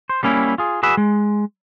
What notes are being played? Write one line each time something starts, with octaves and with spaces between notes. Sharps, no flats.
C5
G3 A#3 C#4 E4
F4 G#4
F#4 G#4 B4 E5
G#3